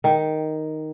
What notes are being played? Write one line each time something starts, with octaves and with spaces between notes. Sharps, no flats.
D#3